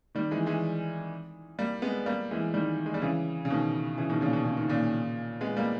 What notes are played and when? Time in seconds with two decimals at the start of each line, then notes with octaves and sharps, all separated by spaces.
0.15 D#3 G3
0.31 E3 G#3
0.46 E3 G#3
1.59 G3 A#3
1.82 G#3 B3
2.06 G3 A#3
2.31 E3 G#3
2.54 D#3 G3
2.86 G#3
2.94 G3
3.02 C#3 E3
3.45 C#3
3.50 B2 D#3
3.98 C#3 E3
4.09 B2 D#3
4.21 A#2 C#3
4.33 B2
4.46 C#3
4.57 D#3
4.68 A#2 C#3
5.41 G#3 B3
5.57 G3 A#3